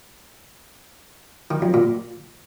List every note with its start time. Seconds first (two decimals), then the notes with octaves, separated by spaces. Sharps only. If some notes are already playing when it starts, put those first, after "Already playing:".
1.51 D#3
1.62 F2
1.74 A#2